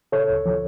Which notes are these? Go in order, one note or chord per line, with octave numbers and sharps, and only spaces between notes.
C#3 A4 C#5
D2
F3